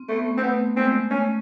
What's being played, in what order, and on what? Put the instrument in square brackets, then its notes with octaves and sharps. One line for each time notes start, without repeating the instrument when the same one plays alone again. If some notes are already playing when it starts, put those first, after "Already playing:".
Already playing: [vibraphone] C4
[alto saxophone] A3 [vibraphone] B3
[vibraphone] A3
[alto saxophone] C4
[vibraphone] A3 [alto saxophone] B3
[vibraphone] G#3 [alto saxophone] C4
[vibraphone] A3 [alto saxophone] C#4